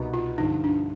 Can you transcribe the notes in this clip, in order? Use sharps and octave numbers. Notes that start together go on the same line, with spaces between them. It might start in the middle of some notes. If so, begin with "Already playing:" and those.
Already playing: C2 B2 B3 D#4
F4
G2 D3 F3 D#4
D4